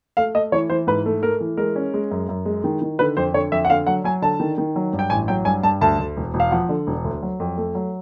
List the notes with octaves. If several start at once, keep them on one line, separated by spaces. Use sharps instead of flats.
A3 F5
A3 D#5
E3 C#5
E3 C5
G#2 B4
A3
A3 A#4
E3
G#3 A#4
C#4
G#3
F#2
F#2
G#3
D#3
D#3
D3 B4
F2 C5
D3 C#5
F2 E5
F#5
D3 F5
F#3 F#5
F#3 G#5
D3 A5
D#3
D#3
F#3
G2
G5
A1 G#5
F#3 G5
G2 G#5
G2 A5
D2 A5
D2
E1
E1
F5
F3 F#5
D3
E1
D2
F#3
F2
A3
F#3